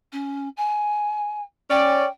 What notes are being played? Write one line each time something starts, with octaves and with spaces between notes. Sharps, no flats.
C#4
G#5
C#4 D5 G5